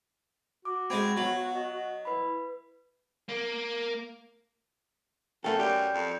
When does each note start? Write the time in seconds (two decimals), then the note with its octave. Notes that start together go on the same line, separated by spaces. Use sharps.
0.65 F#4 D6
0.90 G#3 C4 B5 G#6
1.17 F#3 B3
1.55 D#5 F#5
2.05 E4 B4 B5
3.29 A#3
5.44 F#2 A3 A4 G5
5.59 F#2 G4 D5 G6
5.94 F2